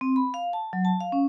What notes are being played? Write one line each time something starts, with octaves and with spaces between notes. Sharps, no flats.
C4
B5
F5
A5
F#3
A5
F5
C#4